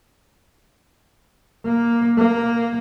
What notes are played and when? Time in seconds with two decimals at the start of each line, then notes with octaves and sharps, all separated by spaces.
1.66 A#3
2.18 A#3